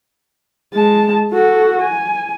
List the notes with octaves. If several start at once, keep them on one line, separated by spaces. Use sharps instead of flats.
G#3 A5
F#4 A4
G#5